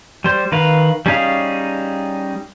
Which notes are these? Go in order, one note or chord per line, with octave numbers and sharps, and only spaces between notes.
G3 C5
D#3 B4 F5
G3 C#4 D#4 G#4 F5